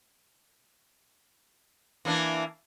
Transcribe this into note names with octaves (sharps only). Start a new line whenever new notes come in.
E3 A#3 D4